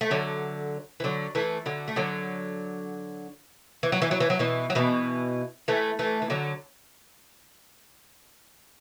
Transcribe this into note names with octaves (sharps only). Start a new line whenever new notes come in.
A3
D3 F#3
E3
D3 F#3
E3 A3
D3 F#3
A3
D3 F#3
E3
F#3
E3
F#3
E3
F#3
B2 E3
F#3
B2 E3
E3 A3
E3 A3
E3
D3 F#3